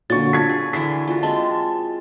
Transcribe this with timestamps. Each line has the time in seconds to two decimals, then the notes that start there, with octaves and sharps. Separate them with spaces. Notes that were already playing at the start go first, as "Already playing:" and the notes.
0.10 A#2 D3 F#3 C#6 A6
0.33 A5 G#6 B6
0.49 G#4
0.73 D3 E3 A#4 B6
1.07 F4 F#4
1.23 G#3 C4 A5